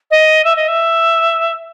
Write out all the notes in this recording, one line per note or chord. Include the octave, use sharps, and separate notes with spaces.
D#5
E5
D#5
E5